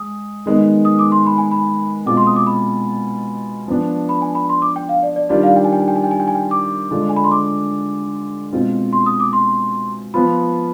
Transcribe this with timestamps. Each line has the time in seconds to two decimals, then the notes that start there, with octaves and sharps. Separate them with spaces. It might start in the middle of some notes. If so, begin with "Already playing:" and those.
Already playing: G#3 D#6
0.46 D#3 G#3 B3
0.85 D#6
0.99 D6
1.12 C6
1.26 B5
1.38 G#5
1.51 B5
2.06 B2 G#3 C4 F4 D6
2.17 C6
2.27 D#6
2.36 D6
2.47 B5
3.68 F3 B3 D4
4.09 B5
4.22 G#5
4.35 B5
4.49 C6
4.62 D6
4.76 G5
4.89 F5
5.03 D5
5.16 D5
5.29 D#3 G3 D4 F4 D5
5.43 F5
5.56 G5
5.64 G#5
5.72 G5
5.80 G#5
5.88 G5
5.96 G#5
6.04 G5
6.11 G#5
6.20 G5
6.27 G#5
6.35 G5
6.51 D6
6.91 D3 G#3 D4 F4
7.09 G#5
7.16 B5
7.24 C6
7.32 D6
8.53 B2 G#3 C4 F4
8.93 C6
9.06 D#6
9.20 D6
9.33 C6
10.14 F3 B3 F4 B5